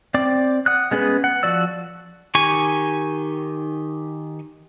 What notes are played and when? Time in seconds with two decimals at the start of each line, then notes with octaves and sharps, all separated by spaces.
0.14 C4 D5 D6
0.66 F#5 D#6 F#6
0.91 G#3 B3 C#4 G#4 B4
1.24 F#5
1.43 F3 F#4 D5 E6
2.35 D#3 G4 G#5 C#6